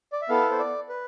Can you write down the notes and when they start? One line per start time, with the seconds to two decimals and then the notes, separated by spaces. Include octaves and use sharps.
0.12 D5
0.22 E5
0.29 B3 E4 A4 F5
0.51 C5
0.59 D5
0.89 B4